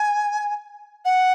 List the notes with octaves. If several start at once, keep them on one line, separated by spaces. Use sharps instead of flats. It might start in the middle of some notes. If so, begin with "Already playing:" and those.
Already playing: G#5
F#5